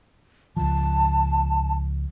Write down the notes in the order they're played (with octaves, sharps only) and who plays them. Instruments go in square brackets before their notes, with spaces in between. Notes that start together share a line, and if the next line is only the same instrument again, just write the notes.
[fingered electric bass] C#2 F3 [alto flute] A5